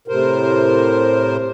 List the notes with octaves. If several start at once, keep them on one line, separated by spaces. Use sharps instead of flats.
A2 C3 A#4 C5